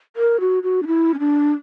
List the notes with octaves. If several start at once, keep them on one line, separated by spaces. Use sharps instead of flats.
A#4
F#4
F#4
D4
E4
C#4
D4